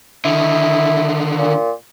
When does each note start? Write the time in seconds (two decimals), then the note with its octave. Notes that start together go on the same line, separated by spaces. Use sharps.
0.25 D3 D#3 E4
1.38 A#2